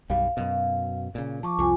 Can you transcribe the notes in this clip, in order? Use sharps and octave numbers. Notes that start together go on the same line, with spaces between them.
B1 F#2 G3 F5
F#2 B2
A#2 C#3
F3 A5 C#6 D6
C2 F2 F4 G#5